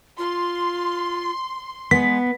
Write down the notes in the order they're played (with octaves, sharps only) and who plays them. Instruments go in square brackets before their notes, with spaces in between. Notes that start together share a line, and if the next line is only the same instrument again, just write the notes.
[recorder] F4 [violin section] C6
[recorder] G#3 [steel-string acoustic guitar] B3 [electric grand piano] B6